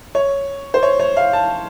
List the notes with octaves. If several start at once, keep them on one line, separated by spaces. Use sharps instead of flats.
C#5
C5
C#5
C#5
F5
A5